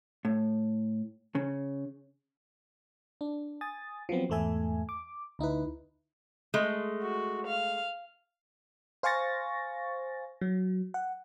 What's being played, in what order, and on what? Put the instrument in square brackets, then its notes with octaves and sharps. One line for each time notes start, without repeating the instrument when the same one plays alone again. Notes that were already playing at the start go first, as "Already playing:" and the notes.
[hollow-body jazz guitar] A2
C#3
[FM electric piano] D4
G#5 D#6 A6
F3 F#3 B3 C4
E2 G#2 A3 A4 E5 G#5
D6
D2 D#4 E4 B4
[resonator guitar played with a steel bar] G#3 A3
[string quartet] F#4
F5
[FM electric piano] C5 F5 G#5 C#6 A6 A#6
F#3
F#5